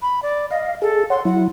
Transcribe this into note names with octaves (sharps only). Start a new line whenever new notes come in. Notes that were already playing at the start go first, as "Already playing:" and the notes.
B5
D5
D#5 F5
G#4 A4
C#5 F#5 C6
F#3 E4 F#5